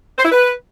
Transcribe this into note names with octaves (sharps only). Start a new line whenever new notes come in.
C5
E4
B4